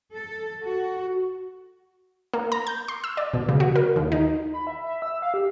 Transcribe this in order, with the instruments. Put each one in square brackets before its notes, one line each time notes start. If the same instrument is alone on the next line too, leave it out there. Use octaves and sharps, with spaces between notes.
[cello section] A4
F#4
[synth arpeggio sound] A#3
A#5
G6
C6
E6
D5
B2
C#3
F#4
A#4
D#2
D#4
[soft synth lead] B5
E5
E5
E6
F5
G4